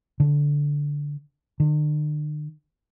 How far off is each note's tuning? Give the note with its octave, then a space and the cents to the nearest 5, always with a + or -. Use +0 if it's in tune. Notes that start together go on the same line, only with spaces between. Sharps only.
D3 -10
D3 +45